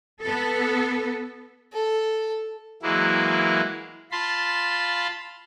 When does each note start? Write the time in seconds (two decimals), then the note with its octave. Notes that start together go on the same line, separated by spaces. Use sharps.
0.22 B3 A4
1.73 A4
2.82 E3 F#3 G#3 A#3 E4
4.12 F4 A5 B5 C6